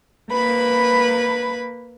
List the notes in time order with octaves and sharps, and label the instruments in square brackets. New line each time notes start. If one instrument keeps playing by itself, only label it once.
[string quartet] A#3 B4 B5